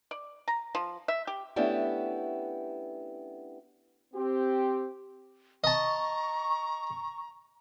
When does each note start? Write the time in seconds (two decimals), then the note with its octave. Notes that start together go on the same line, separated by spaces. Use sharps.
0.11 D5
0.48 A#5
0.75 F3
1.08 E5
1.27 G4
1.56 A3 B3 C#4 D4 E4 G4
4.14 C4 G4
5.64 D#5 A5 A#5 C#6